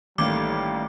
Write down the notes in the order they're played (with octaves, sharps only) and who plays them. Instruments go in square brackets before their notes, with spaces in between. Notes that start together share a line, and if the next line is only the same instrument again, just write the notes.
[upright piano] A1 A#3 [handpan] D#3 A3 [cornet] G3 [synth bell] D6